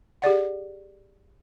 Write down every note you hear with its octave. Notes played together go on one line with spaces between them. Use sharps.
G4 G#4 D5 F#5